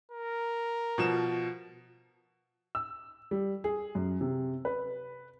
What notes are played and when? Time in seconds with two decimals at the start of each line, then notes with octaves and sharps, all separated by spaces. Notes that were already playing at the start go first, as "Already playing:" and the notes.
0.12 A#4
0.98 B2 F3 E7
2.75 E6
3.31 G3
3.64 G#4
3.95 F#2
4.21 C3
4.65 B4